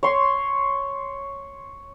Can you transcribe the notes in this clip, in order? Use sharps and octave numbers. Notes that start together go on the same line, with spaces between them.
C#5 C6